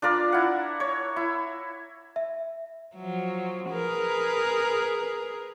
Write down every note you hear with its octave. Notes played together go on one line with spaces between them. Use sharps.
D4 F4 A#4 D5
E4 F#5
C#5
E4
E5
F3 F#3
G#4 A#4 B4